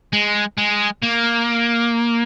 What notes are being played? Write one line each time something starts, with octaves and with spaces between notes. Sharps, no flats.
G#3
G#3
A#3